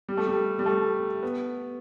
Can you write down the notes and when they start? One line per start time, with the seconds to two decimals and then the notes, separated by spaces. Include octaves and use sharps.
0.09 G3
0.17 A3
0.27 G3
0.59 G3
0.66 A3
1.23 B3